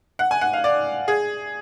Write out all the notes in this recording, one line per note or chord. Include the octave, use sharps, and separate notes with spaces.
F#5
G#5
F#5
F5
D5
G#4